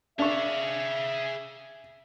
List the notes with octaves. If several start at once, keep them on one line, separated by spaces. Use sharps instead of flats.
D4 G#4 E5 F5 C#6